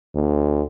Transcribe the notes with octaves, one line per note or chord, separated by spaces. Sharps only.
D2